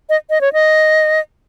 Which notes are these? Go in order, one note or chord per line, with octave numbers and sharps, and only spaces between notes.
D#5
D#5
C#5
D#5